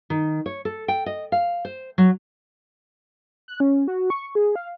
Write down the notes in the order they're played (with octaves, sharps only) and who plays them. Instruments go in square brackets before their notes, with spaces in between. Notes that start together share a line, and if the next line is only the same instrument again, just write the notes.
[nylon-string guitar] D#3
C#5
A4
G5
D#5
F5
C5
F#3
[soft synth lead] F#6
C#4
F#4
C#6
G#4
F5